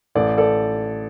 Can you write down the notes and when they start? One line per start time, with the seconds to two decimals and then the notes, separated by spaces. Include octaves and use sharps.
0.15 A1 A4 D5
0.38 A4 D5